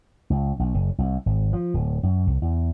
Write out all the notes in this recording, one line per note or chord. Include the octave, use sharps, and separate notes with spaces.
C#2
B1
F#1
C2
G#1
F3
D1
F#2
C2
E2